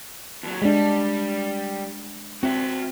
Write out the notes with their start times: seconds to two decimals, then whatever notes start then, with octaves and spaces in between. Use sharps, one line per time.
0.43 D#2 F#3
0.62 G3 G#3 D4
2.43 C4 F#4 E5